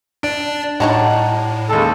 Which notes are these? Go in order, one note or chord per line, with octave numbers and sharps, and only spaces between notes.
D4 D5 D7
A2 G3 D#4 C#5 F#5 A5 A#5
D#2 C#3 G#3 A4 A5